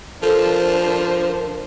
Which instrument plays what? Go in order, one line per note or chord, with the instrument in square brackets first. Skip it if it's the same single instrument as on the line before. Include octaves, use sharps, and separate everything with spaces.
[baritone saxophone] F3 [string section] D4 C5 [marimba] A4 [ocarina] A#4